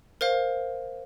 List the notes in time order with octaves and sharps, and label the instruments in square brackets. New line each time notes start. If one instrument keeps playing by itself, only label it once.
[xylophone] A#4 C5 F5